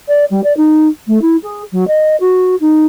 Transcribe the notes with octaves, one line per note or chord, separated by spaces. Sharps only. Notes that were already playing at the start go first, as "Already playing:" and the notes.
D5
G3
D5
D#4
A3
E4
G#4
F#3
D#5
F#4
D#4